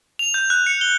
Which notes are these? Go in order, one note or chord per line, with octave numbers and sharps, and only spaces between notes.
F7
G6
F#6
C#7
G7